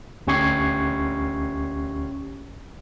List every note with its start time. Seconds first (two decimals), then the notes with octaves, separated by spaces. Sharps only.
0.27 D2 C#4 G4 C#6 G#6 C7